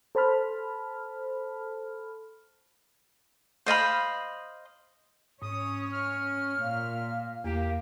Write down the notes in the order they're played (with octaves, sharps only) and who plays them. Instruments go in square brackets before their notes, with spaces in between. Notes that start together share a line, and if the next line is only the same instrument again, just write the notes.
[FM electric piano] A4 C5 A5 B5 F6
[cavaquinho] C5 D#5 F5 B5
[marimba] G#2 [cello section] C#4 C#5 [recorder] D#6
[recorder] F6
[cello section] A#2 [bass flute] F5
[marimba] E2 [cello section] A#3 [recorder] G4